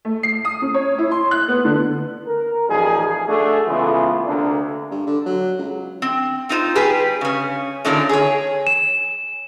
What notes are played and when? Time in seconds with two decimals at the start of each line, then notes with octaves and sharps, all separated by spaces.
0.05 A3
0.23 C7
0.45 D#6
0.62 C#4
0.74 C#5
0.98 E4
1.12 C6
1.31 F#6
1.48 B3
1.65 D3
2.27 A#4
2.68 A1 D#3 F3 G3 G#4
3.27 A3 D4 F#4 G#4
3.67 C#3 E3 G#3 A3 B3 F4
4.25 D2 C3 A#3 D4
4.91 G2
5.07 D3
5.26 F#3
5.58 C#2
6.02 C4
6.49 C4 D#4 F4 C5
6.75 G3 G4 G#4 B4
7.21 C#3 C#4
7.85 A#2 D3 D#3 A3 C#4 D4
8.09 G#4 C#5
8.67 E7